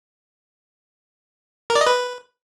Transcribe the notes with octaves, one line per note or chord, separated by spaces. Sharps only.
A#4
D5
D#5
B4